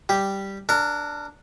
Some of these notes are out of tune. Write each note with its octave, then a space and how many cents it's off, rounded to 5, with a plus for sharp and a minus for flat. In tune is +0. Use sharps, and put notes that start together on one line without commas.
G3 +0 G4 +0
D4 +0 A#4 -25